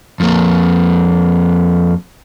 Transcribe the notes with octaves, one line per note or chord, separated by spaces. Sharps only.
F2 A#3